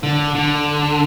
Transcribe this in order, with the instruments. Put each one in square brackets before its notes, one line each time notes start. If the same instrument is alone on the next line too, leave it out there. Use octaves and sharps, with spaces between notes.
[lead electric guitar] D3
D3